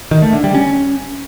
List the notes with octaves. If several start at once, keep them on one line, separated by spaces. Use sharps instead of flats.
D#3
A3
D3
G3
C#4